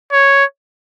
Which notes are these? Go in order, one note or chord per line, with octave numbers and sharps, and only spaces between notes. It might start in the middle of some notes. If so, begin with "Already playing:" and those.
C#5